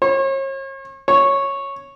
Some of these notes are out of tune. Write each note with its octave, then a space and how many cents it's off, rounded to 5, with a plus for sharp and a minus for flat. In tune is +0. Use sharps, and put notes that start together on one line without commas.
C#5 -40
C#5 -5